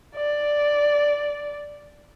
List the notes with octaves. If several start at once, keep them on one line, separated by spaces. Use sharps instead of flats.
D5